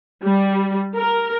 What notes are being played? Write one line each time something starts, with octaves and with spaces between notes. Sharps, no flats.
G3
A#4